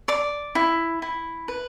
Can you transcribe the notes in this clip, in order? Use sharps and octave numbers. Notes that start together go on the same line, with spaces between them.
D5 D6
E4
E4
B4